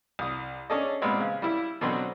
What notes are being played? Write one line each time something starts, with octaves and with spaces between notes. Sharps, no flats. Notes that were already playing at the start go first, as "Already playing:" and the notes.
C2 D#6
C#4 D4 G#4 A4 D5 D#5
A#2 G3 G#3 B3 C4
C#3
G3 E4
B2 D3 F#3 C4 C6